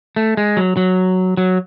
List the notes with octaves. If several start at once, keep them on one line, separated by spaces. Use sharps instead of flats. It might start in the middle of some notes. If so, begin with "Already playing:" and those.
A3
G#3
F#3
F#3
F#3